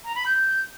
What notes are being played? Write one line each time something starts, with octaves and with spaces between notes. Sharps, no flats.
A#5
B5
G6